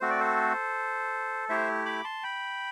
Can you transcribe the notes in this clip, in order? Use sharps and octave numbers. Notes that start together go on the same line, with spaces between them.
A3 C4 F#4 C5
D5
A4 C5
A3 E4 G4 C5 E5
B5 D6
A5 C6
G5 B5